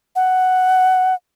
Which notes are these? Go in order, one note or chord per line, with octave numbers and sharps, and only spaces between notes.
F#5